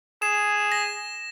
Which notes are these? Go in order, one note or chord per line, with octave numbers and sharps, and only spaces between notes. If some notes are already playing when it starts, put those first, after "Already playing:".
G#4 E7
A#6